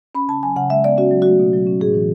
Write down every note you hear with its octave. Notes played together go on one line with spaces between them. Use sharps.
C#4 B5
C#3 A5
F#3 G#5
C#3 F#5
G#3 E5
B3 D5
C#4 F#4
F#3
A3 F#4
B2
F#3
C#4
A2 G#4
E3